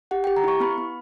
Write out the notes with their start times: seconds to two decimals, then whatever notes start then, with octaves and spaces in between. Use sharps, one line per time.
0.11 G4 F#5
0.24 G5
0.27 G4
0.36 A#5
0.44 E4 C#6
0.60 B3 B5
0.78 B3